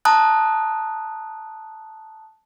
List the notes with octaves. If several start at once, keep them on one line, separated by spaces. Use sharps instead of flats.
A5 A#5 D#6 F#6